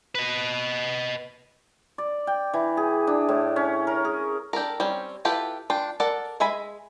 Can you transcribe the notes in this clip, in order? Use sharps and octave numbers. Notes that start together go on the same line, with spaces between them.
B4 D#5
D5
G5
E3
G#4
D4
A2
C#4
A#4
G#4
D4 G4 A4 A#4
G3 C4 C#4
E4 F4 G4 A4 B4
D4 F4 G5
A4 A#4 D5 F#5
G#3 E5 G#5 B5